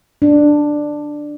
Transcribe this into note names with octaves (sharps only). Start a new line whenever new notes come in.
D4